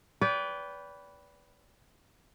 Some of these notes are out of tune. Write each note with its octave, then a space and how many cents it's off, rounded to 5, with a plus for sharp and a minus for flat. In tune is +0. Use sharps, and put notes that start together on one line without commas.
B4 +0 D5 -35 G5 +0